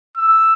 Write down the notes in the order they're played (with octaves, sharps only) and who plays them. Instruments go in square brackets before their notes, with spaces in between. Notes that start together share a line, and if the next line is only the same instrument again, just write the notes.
[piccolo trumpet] E6